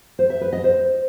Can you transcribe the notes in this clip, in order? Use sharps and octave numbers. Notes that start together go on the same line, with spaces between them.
C5
E5
B4
D#5
C5